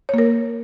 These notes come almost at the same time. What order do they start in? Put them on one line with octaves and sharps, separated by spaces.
C#5 A#3 A#4